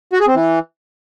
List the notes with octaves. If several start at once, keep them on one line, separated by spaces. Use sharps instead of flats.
F#4
G#4
C4
E3